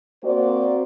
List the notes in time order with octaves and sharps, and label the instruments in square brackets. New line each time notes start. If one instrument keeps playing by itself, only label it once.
[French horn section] A#3 C4 F#4 C5 D5